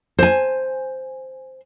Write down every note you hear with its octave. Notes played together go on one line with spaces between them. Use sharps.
C5 G#5